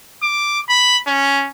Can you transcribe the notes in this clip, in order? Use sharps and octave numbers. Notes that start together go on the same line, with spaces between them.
D6
B5
C#4